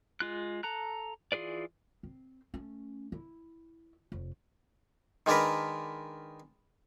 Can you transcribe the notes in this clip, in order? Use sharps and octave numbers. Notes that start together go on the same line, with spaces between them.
G#3 F4 F#6
A4 A#5 F#6
E3 F4 G#4 B4 D5
C4
A3 C#4
E4
F1
D#3 G#3 D4 A#4 B4